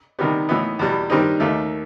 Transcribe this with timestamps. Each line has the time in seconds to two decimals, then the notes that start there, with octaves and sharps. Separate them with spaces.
0.19 C3 D#3 G3 B3
0.49 A2 E3 B3 D#4
0.79 E2 B2 G3
1.10 G2 D#3 G3 C4 D#4
1.40 D#2 D#3 A3